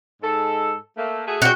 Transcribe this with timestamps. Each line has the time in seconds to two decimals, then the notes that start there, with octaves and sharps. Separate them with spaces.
0.21 G#2 G#3 A4
0.96 A3 A#3
1.27 A3 F#4 G#4
1.42 C#3 D4 F#4 G5